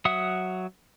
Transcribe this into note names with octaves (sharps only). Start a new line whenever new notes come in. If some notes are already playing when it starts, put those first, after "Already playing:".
F#3 E5 F#5 D#6